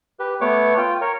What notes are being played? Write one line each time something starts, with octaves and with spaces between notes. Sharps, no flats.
G4 B4
A3 B3 C#5 D6
F4 G5
A#4 C#5